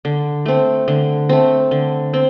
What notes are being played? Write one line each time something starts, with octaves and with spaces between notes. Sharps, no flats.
D3
A3 C4
D3
A3 C4
D3
C4